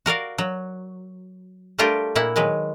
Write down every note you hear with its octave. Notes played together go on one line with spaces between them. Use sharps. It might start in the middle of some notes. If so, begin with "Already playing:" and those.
F#4 A#4 D5 F5
F#3
G3 A3 D4 F4 G4 A#4
A#2 A#3 E4 F#5
D#3 F#3 G#3 B4